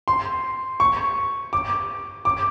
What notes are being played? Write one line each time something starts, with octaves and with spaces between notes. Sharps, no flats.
C6
C#6
D6
D6